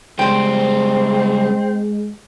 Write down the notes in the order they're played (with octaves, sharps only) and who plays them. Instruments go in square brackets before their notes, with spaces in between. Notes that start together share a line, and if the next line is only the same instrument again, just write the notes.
[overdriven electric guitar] C#3 G3 [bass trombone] G#3 [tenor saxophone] C4 [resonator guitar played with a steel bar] C5 G5